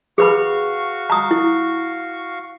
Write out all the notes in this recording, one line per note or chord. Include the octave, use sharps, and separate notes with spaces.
F#4 G#4 B4 F5 B5 C#6
A#5 D#6
E4